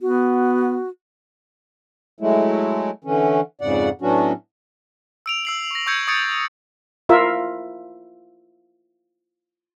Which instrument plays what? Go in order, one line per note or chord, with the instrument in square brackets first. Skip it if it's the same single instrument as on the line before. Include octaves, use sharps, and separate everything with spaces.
[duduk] B3 [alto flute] F#4
[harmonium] F#3 G#3 A3 E4
D3 E3 C#4
F2 G#2 C#3 D5 F#5
A2 F#3 B3 C#4 D4 F#4
[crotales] E6 D7 F7
E6 C7 F#7
C#6 A#6
C#6 E6 G6 G#6 C#7
C#6 D#6 G#6 A6 C#7 D7
[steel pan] E4 F4 A#4 E5